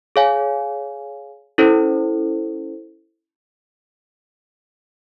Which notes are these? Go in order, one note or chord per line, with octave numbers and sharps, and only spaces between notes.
G#4 C#5 F5 G#5
C#4 E4 A4 C5